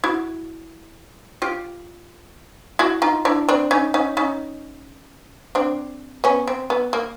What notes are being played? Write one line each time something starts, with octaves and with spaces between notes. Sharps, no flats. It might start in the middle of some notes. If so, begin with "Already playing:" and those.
E4 F#4
F4 G4
E4 F#4
D#4 F4
D4 E4
C4 D4
C#4 D#4
C#4 D#4
C#4 D#4
C4 D4
B3 C#4
C4
B3
A#3